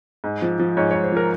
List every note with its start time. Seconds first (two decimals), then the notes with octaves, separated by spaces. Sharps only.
0.24 G#2
0.42 F3
0.59 F3
0.77 G#2 C#5
0.91 G#2 C#5
1.04 C5
1.12 F3 A#4